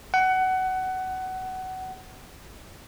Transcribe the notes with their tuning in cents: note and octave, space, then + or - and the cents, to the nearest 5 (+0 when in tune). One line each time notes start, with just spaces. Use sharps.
F#5 +20